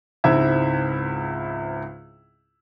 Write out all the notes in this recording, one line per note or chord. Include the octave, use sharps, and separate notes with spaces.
C#2 G#2 C4 E4 E5 G#6